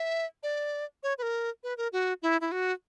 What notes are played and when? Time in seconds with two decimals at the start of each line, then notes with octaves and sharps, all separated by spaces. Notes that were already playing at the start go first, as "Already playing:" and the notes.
Already playing: E5
0.43 D5
1.03 C#5
1.18 B4
1.22 A#4
1.63 B4
1.77 A#4
1.93 F#4
2.22 E4
2.41 E4
2.52 F#4